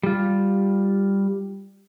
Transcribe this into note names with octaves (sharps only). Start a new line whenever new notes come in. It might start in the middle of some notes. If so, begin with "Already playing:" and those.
G3 F4